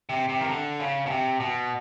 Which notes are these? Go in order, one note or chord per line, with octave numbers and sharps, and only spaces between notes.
C3
C3
D#3
D3
C#3
B2
C3
B2